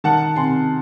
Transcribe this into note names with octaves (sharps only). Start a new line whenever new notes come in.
D#3 F#5 A5
C3 G#5 C6